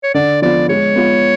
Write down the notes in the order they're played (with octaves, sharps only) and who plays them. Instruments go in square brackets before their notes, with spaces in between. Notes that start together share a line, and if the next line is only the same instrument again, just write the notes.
[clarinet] C#5
[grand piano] D3 [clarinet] D5
[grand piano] F3 B3 F4 [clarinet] D5
[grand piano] G#3 [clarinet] C#5
[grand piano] B3 F4